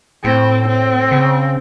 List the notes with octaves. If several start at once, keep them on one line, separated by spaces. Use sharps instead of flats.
A2 C4
C4
C#3